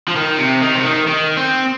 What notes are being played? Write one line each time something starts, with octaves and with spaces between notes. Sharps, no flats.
F3
D#3
C3
D#3
C3
D#3
D#3
C4